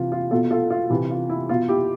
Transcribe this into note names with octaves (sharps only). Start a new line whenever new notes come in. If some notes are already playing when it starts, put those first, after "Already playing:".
Already playing: C3 E3 F4
F4
B2 F4 A4
F4 A4
F4
C3 E3 E4
F4
E4
B2 F4
E4 G4